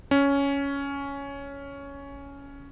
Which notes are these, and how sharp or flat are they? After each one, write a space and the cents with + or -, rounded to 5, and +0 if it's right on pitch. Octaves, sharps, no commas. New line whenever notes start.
C#4 +10